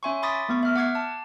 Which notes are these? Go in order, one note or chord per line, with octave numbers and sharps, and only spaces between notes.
C#4 E5 G#5 C6 C#6
B5 C6 D6 D#6 A6 B6
A3 B3 C#6
E5 F6
F#5 D6 G#6 C7
A5